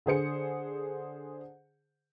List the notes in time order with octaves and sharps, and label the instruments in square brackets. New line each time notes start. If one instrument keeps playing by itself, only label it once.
[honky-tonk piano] D3 G#4 C5 C#7